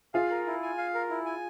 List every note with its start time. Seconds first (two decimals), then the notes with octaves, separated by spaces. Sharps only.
0.14 F4 G#4 F5
0.30 A#4
0.47 E4
0.62 G#5
0.78 F5
0.94 A#4
1.10 E4
1.26 G#5